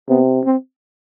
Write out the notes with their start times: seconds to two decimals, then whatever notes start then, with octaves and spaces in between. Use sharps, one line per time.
0.09 C3 B3
0.44 C4